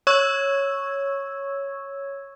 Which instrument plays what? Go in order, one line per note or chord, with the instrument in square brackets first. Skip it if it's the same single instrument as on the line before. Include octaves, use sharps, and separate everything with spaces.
[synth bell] C#5 C#6 E6 G#6